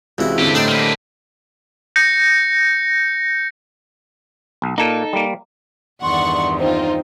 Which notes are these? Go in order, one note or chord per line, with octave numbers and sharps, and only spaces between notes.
C#2 C3 E3 E4 F#4
D3 G3 C4 G4 B4
A2 D4 D#4 C5
A#3 B4
G6 A#6 C#7
B1
A#2 A#3 D#4 A4
G3 A#3
E2 G2 D#3 D5 F#5 C6 C#6
C4 D#4 F4 C5